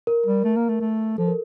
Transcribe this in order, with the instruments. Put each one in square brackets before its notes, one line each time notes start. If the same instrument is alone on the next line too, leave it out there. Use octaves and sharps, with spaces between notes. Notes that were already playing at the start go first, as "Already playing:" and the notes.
[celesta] A#4
[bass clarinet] G3
A3
A#3
A3
A3
[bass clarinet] F3 [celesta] A4
[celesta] A#4